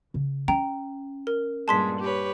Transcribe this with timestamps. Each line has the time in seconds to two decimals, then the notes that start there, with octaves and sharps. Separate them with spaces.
0.14 C#3
0.48 C#4 G5 A#5
1.27 A#4
1.68 G2 A#2 G#3 A5 C6 B6
2.00 G4 B4 C#5